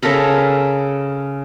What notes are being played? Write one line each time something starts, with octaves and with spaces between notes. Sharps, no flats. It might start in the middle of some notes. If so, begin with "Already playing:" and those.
C#3 A4 A#4 B5